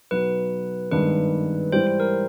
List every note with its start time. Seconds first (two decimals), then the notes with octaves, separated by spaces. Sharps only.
0.11 B1 B2 F#3 B4
0.92 G#1 G2 D#3 G#3 B3 B4
1.72 G#2 E3 G3 C5
1.87 C5
2.00 A#4